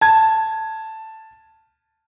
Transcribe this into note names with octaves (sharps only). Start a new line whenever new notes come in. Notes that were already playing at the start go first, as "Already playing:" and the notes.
A5 G#6